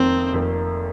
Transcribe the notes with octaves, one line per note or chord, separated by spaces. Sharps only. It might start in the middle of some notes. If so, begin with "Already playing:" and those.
Already playing: F1 F2 D#3 A#3 C4
F1 F2 D#3 A#3